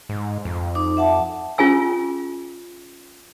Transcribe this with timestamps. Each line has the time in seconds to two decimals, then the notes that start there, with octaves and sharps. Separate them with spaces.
0.09 G#2
0.45 F2
0.75 D#4 D6
0.97 E5 F#5 A5
1.58 C#4 F4 G#4 G#5 E6